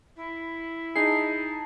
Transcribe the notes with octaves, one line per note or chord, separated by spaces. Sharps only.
E4
D#4 G#4 A5 C7